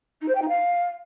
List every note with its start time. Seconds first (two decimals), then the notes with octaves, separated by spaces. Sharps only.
0.21 D#4
0.28 C5
0.35 G5
0.41 D#4
0.48 F5